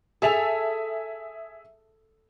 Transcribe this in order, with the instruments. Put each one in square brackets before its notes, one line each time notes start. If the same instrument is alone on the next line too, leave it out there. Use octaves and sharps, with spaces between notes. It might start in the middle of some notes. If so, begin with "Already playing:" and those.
[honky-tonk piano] G#4 E5 F7 [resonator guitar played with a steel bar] A4 G#5